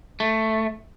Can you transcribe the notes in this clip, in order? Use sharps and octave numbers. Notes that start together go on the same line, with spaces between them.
A3